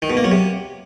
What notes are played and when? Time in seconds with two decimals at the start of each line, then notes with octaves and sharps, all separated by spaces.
0.02 D#3
0.10 B2
0.17 A#3
0.24 F#3
0.32 C3